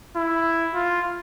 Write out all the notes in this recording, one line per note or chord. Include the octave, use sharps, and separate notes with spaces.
E4
F4